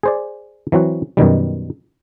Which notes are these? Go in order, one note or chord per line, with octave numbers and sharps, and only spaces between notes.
G#4 C5 D5
E3 F#3 C4 F#4
F#2 B2 D#3 G3